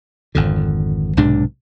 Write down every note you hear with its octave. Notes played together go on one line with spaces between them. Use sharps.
G#1 F2 D3
B1 G#2 C3 D4